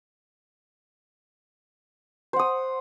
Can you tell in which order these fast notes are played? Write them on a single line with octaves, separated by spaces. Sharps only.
C5 F#5 D#6